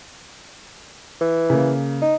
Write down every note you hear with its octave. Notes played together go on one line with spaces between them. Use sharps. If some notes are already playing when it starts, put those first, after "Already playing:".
E3
C#3 A#3
D#4